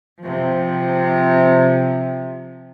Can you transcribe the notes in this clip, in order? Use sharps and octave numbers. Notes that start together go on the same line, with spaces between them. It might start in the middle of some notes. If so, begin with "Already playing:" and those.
C3 F3